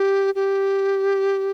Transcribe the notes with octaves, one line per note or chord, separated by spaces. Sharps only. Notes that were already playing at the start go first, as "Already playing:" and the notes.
Already playing: G4
G4